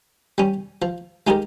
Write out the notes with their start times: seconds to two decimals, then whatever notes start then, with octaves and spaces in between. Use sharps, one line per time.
0.38 G3 C#4
0.82 F3
1.27 G#3 D#4 G4 A#4